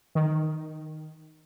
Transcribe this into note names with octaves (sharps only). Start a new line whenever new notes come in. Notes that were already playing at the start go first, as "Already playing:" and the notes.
D#3